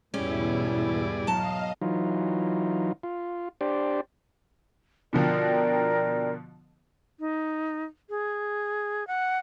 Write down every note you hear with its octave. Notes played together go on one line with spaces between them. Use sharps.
E2 G#2 B2 G3 C#4 E4 G#4 D5
F#3 D#5 F5 A5
E3 F#3 D#4 F4
F4
D4 G4 C5 D5
B2 D3 F3 A#4 D5 G5
D#4
G#4
F#5